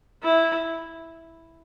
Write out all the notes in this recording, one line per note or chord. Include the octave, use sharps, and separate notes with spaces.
E4